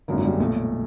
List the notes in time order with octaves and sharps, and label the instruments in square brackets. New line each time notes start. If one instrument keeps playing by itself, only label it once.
[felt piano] G#1 F#2 D3 A#3
F#3
G3
G#3
B1 A#2 A3